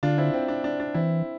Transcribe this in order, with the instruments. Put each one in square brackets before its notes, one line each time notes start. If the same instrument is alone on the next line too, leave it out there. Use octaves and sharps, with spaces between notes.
[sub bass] D3 [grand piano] D4 F4
[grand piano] C4 E4
C4
D4
D4
D4
[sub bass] E3 [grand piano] C4 E4